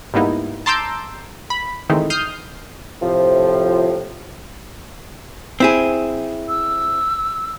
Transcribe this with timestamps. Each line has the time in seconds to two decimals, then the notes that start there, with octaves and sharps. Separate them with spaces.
0.14 G#2 G3 A#3 B3 D#4 E4
0.66 A5 A#5 C6 D6 E6 G6
1.50 B5
1.89 D#3 E3 G#3 A3 C4 D#4
2.10 D#6 F6 G6 C7
3.02 A2 C3 F3
5.60 C4 E4 G#4
6.49 E6